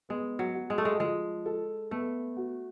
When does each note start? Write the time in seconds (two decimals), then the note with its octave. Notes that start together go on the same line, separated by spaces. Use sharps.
0.09 G#3 B3
0.39 F#3
0.55 F#4
0.70 G#3
0.78 A3
0.85 G#3
1.00 F3 G#3
1.46 A4
1.91 A3 B3
2.37 F#4